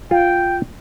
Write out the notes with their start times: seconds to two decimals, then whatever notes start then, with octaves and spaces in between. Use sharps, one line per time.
0.11 F4 G5